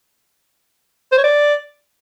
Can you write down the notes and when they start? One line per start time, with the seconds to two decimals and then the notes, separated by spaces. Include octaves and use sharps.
1.12 C5
1.18 C#5
1.24 D5